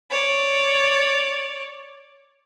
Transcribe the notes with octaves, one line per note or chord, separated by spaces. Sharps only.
C#5 D5